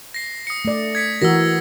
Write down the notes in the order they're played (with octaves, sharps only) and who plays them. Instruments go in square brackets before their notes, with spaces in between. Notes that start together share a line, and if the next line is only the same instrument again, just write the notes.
[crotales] A#6 C7
D#6 C#7
[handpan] A3 D5
[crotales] G#6 B6 C#7
[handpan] E3 F#4 A#4 [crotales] E6 A#6